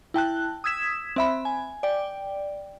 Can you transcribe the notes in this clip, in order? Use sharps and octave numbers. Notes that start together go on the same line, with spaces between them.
E4 G5 A5 F#6
D#6 E6 G#6 B6 E7
C4 E5 B5
G#5
D5 G5